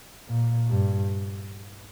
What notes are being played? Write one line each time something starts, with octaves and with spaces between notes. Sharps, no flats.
A#2
G2